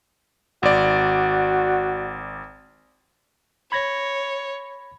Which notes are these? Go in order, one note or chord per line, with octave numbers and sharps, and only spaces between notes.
G#1 F#4 D5
C#5 B5 G#6 A#6